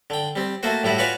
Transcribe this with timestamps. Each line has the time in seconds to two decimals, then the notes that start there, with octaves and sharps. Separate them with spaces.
0.10 D3 G5
0.36 G3 C4
0.63 A3 A#3 F#4 C5
0.83 A2 G3 E4 F#4
0.98 F4 F#4 B4 C#5 D5 G#5